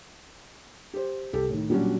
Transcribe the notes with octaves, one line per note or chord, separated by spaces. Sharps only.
G4 C5
C2 G4 A4
A2 D#3
A#2 F#3 G3 C#4 D4 F#4